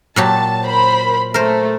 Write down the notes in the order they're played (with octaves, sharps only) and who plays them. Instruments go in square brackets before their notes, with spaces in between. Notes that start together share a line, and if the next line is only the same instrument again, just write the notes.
[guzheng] A#2 F#3 G4 [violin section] A5
[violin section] A#4 C5 B5
[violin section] A3 [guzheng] A#4 C5